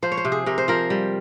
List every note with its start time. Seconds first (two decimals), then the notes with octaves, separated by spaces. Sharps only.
0.02 F3 C5
0.12 C#5
0.17 C5
0.25 C3
0.32 G#4
0.46 C3 A#4
0.58 C5
0.68 F3 A#4
0.90 G3